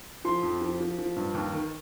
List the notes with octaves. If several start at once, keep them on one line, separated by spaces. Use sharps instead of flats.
F3 C6
F2
F3
F3
F3
G2
D#2
D#3